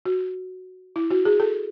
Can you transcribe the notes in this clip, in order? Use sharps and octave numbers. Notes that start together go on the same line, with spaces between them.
F#4
E4
F#4
G#4
A4